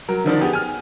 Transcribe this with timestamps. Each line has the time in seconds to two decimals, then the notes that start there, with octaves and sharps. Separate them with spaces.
0.09 F#3 A#4
0.24 D3 D#3 F3 D4
0.41 B3 G4 G#4
0.53 G#5 F6